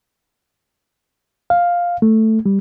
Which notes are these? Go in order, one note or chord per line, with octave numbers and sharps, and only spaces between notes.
F5
A3
G3